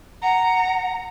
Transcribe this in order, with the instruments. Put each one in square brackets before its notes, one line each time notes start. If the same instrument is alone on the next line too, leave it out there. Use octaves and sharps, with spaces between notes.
[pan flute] F#5 [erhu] A#5